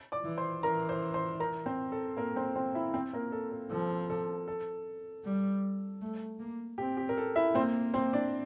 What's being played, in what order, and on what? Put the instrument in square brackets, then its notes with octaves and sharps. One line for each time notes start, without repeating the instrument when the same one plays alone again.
[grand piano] D5 D6
[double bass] E3
[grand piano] C5 C6
[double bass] E3 [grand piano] A#4 A#5
[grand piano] C5 C6
C5 C6
A#4 A#5
C4 C5
A4
A#3 A#4
C4 C5
C4 C5
E4 E5
C4 C5
A#3 A#4
A4
A4
[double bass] F3 [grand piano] A4
[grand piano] A4
A4
[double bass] G3
A3
A#3
[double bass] C4 [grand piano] G4
[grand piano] G4
A#4
A4
E4 E5
[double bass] A#3 [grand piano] C4 C5
[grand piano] C4 C5
D4 D5